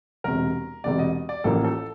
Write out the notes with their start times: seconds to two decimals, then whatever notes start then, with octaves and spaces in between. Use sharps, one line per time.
0.24 E1 E2 C3 A#4
0.84 E1 E2 C3 D5
0.99 D#5
1.29 D5
1.44 A1 A2 F3 A#3 A4
1.64 A4